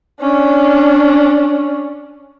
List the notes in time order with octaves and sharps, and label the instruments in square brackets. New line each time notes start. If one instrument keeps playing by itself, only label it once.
[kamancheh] C#4 D4